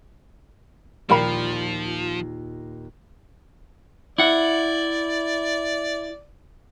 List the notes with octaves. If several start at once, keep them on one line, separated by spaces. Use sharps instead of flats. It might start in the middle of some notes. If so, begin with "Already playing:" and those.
D#2 A#2 F3 A#4 G5 B5
E4 D5 F#5